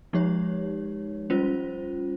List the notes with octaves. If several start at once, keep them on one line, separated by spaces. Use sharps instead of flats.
F3 G#3 D#4 G4 C#5
G3 C#4 F4 C5